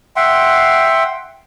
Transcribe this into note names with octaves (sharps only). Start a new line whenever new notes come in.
E5 F#5 G5 C6